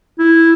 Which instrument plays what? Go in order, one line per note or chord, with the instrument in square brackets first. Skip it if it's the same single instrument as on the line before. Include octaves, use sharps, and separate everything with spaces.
[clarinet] E4